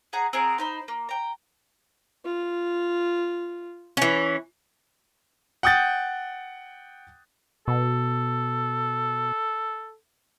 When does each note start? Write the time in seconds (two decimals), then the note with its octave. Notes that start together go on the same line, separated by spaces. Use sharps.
0.13 G#4 F#5 A#5
0.33 C4 G#4 A#4 F#5
0.58 D#4 C5 B5
0.88 A#3
1.09 G5 A#5
2.25 F4
3.97 E3 C#4
5.63 F#5 G5 D#6 G6 A6
7.68 B2 A4